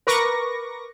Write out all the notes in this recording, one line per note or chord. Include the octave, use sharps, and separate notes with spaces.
A#4 B4 C#6 D6 A#6